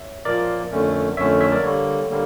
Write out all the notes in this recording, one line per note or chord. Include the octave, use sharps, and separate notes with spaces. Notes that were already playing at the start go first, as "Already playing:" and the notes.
Already playing: C#5 E5
A#2 F3 A#3 A#4 D5
F2 D3 A3 C#4
F2 D3 A3 C#4 C#5 E5
C#5 E5
A#4 D5
D3 G3 A#3 A4 C#5
D3 G3 A#3